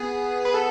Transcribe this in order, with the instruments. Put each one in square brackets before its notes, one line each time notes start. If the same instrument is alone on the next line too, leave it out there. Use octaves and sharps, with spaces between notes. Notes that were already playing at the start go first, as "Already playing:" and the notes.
Already playing: [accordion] B3 [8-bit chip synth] G#4
[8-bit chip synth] B4
A4